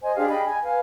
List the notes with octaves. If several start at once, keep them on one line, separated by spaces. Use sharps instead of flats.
C5 D#5 G#5
D4 G4 G#4 F5
D#5 G5 B5
G#5
B4 F5 G#5